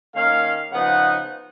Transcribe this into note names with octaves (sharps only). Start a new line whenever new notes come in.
D#3 A#3 C#4 F5
C#3 F3 B3 D#4 F#5